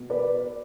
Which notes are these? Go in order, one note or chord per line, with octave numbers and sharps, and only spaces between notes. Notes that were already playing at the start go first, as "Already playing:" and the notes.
Already playing: B2
B4 D5